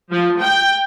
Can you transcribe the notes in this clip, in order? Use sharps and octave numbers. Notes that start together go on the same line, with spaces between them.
F3
G5